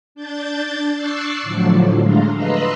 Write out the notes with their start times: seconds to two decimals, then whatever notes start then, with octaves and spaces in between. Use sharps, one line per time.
0.15 D4 G6 A6
0.94 C#6 D6 E6 F#6 A6 C7
1.42 A2 D3 F3 F#3
2.02 G#3 A3 D4 F5 A#5 C6
2.35 B4 D#5 A#5 C6 E6 F#6